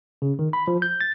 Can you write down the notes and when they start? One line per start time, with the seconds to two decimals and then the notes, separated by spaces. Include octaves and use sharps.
0.22 C#3
0.39 D#3
0.53 B5
0.68 F3
0.82 G6
1.01 A6